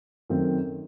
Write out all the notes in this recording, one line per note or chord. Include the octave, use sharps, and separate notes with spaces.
F#2 D#3 A3 C4